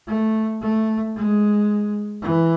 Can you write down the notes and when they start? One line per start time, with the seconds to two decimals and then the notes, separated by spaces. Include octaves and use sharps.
0.08 A3
0.62 A3
1.16 G#3
2.22 E3